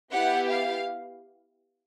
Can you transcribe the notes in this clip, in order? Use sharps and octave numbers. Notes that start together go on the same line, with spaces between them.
B3 E4 G4 F#5
F5